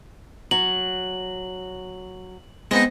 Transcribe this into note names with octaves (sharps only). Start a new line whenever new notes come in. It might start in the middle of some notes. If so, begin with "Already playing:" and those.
F#3 F#7
G#3 B3 C4 D#4